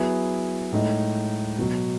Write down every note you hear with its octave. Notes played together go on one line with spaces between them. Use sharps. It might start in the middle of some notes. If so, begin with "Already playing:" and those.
Already playing: F#3 B3 E4 G#4
A2 G#3 D#4
B2 F#3 B3